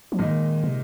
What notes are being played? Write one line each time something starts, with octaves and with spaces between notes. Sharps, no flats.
F3
A#2 D#3 G#3 D#4
C3